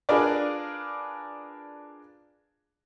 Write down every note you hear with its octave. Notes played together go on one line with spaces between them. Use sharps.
D4 F4 G#4 A#4 B4 D5